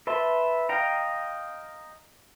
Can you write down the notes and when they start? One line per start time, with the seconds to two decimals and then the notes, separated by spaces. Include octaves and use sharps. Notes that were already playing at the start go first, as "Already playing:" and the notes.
0.07 B4 E5 A5 C6
0.69 D#5 F5 G5 A#5